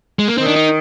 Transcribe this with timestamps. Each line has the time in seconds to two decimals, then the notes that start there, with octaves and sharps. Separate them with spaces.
0.19 G#3
0.28 A#3
0.38 D#3 C4
0.46 D4
0.56 D#4